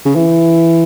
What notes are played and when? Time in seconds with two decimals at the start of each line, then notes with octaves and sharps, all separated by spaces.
0.05 C#3
0.15 E3